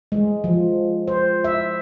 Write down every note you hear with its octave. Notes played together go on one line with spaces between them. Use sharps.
G#3
F3
C5
E5